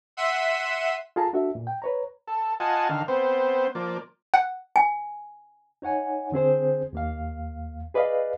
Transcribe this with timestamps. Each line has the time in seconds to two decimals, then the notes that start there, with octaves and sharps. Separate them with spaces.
0.17 E5 F#5 C6 E6 B6 D#7
1.16 F4 G#4 A4 A5 A#5
1.33 D4 F#4 A4 E5
1.55 A#2
1.67 G5
1.82 B4 C#5 A#5
2.28 A4
2.60 F4 D#5 F#5 G#5 A5
2.89 D3 D#3 F5
3.08 B3 C4 C5
3.75 F3 A#3 D5
4.34 F#5
4.76 G#5
5.82 D#4 C#5 F#5 G#5
6.32 D3 C4 G#4 C5
6.93 D#2 A#3 F5
7.94 G#4 B4 D5 D#5 F5